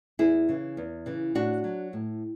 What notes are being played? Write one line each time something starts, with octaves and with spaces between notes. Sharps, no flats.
E2 E4 G#4
C#3 E3
E2
C#3 E3
A2 D4 F#4
F#3
A2